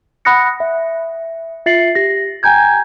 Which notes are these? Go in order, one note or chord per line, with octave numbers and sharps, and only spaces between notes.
F#5 B5 D#6 F#6 A#6 C#7
E5
F4 E5 A6 C7 C#7 F#7
G4 A#6
G5 G#5 A#5 G6 G#6